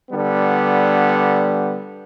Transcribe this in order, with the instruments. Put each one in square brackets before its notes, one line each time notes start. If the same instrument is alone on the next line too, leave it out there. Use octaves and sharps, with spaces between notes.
[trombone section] D3 G3 B3